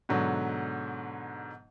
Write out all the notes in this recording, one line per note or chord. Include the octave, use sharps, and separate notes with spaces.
G#2 B2 D3 F#3